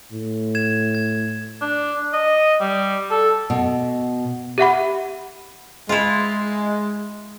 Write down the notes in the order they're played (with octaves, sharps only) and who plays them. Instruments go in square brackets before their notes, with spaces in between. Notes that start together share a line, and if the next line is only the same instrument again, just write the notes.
[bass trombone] A2
[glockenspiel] G#6 E7
G#6
[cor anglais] D4
D#5
G3
A4
[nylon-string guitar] B2
[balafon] G4 E5 F#5 B5
[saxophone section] G#3 [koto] E4 F4